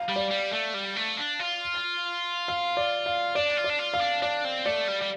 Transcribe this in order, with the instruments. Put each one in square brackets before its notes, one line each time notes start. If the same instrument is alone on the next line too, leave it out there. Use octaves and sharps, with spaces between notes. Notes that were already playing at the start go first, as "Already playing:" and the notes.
Already playing: [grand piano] F5
[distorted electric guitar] G3
[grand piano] D5
[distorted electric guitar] G3
A3
G3
A3
D4
F4
[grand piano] F5
D5
F5
[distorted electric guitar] D4 [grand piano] D5
[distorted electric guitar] F4
[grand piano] D5
[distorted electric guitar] D4
F4
[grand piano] F5
[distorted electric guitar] D4
[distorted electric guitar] D4 [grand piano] D5
[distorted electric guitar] C4
[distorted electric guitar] A3 [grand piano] D5
[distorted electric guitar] G3
G3